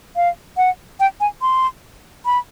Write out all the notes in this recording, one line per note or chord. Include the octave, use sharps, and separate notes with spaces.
F5
F#5
G5
G#5
C6
B5